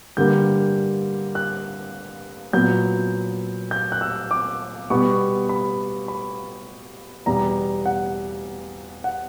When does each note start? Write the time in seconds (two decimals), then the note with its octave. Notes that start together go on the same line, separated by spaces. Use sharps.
0.17 G2 D3 G3 A#3 G6
1.35 F#6
2.53 A#2 F#3 B3 G6
3.71 G6
3.92 F#6
4.01 E6
4.31 D6
4.90 B2 G3 B3 C#6
5.49 B5
6.08 B5
7.26 E2 B2 G3 A#5
7.86 F#5
9.04 F#5